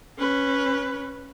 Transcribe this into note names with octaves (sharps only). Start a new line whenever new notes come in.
C#4 B4